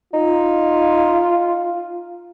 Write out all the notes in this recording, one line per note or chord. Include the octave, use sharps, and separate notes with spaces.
D#4 F4